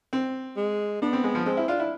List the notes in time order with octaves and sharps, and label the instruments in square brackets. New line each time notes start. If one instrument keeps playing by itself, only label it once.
[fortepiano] C4
[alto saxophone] G#3
[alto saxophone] B3 [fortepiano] D4
[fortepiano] C4
G#3
F3
[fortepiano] G#3 [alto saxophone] C4
[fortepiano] E4
[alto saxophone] D4 [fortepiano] F4
[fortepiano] E4